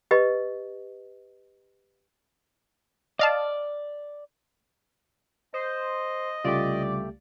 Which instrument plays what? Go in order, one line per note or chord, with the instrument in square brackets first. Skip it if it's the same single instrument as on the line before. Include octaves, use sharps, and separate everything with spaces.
[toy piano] G4 B4 D#5
[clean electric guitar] D5 [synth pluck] D#5 F5 A5
[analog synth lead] C5 [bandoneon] D#5
[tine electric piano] C2 A3 G4 [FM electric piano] C#3 G3 F4 [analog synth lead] D5